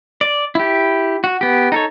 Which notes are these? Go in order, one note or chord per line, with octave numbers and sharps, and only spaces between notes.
D5
E4 G4
F#4
B3 G4
D#4 A4 C#5